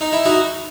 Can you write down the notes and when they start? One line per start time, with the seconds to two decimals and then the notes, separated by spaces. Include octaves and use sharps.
0.01 D#4
0.12 E4
0.25 D#4 F#4